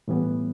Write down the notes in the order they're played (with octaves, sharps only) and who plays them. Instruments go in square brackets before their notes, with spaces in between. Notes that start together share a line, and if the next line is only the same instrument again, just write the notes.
[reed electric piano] A2 E3 G3 B3